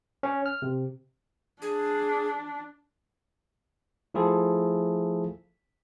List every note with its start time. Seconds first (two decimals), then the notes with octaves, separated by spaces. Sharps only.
0.23 C#4
0.46 F6
0.62 C3
1.62 D4 G#4
4.14 F3 A3 E4 F4 G#4 A4